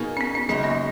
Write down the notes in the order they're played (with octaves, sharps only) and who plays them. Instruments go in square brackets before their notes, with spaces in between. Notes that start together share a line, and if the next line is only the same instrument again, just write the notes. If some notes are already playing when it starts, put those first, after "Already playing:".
Already playing: [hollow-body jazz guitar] B2 A#3 D#4 G#4
[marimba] C#4
B3
C#4
[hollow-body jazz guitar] F#2 C#3 G#3 [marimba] C#4
[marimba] A#3